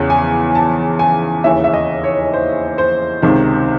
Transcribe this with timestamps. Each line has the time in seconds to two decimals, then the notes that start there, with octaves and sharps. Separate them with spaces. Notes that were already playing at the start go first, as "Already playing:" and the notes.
Already playing: E2 C#3 E3
0.10 G#5
0.55 A5
0.99 G#5
1.44 D#2 C#3 E3 E5
1.64 E5
1.73 D#5
2.03 C#5
2.33 C5
2.78 C5
3.22 C#2 C3 D#3